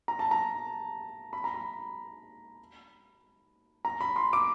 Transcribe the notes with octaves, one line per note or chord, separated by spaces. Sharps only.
A#5
A5
A#5
B5
A#5
B5
A#5
B5
C6
D6